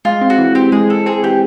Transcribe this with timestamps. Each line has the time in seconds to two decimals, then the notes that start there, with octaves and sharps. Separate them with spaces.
0.05 G#3 F4
0.21 C4
0.30 F#4
0.38 E3
0.55 C4 G4
0.72 G#3 G#4
0.89 G#3 A4
1.06 C4 G#4
1.23 E3 G4